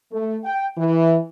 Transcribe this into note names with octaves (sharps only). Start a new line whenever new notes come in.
A3
G5
E3